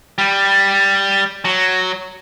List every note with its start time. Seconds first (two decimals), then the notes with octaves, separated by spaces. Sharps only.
0.18 G3
1.45 F#3